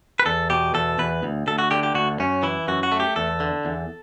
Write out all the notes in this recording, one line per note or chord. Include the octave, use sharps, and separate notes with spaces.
B4
E2 A4
B2 G4
E2 A4
E2 B4
D2
D2 A4
F#4
D3 G4
G4
D2 F#4
F#2 C#4
E3 E4
F#2 F#4
F#4
A3
G4
E2 A4
D3
E2